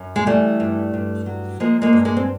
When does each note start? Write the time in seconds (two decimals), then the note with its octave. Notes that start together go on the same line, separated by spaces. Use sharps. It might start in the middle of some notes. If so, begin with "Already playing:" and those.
Already playing: F#2
0.16 G#3
0.26 E3 G3 A3
0.60 G2
0.94 G2
1.26 F#3
1.60 F3 G#3 A#3
1.82 G#3 A#3
1.93 G2
2.05 G#3 A#3
2.17 C4